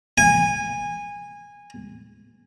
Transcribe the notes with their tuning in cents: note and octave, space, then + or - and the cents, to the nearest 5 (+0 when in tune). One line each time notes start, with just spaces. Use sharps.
G#5 -20